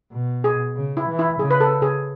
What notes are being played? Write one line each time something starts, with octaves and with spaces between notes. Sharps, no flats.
B2
G#4
C#3
E4
E3
E4
C#3 G#4
B4
A4
G#4